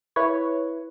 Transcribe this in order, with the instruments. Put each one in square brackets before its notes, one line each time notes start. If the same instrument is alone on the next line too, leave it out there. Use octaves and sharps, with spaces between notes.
[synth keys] E4 B4 C#5